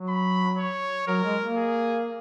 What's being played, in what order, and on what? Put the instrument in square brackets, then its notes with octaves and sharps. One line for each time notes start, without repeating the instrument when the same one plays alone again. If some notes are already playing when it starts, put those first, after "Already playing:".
Already playing: [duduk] F#3
[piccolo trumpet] B5
C#5
[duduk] F#3 [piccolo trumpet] A#4
[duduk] G#3
A#3
[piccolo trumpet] G#4